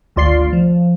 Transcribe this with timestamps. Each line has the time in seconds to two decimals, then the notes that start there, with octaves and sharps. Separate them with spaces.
0.16 G#1 D2 F4 D5 C6 C7
0.53 F3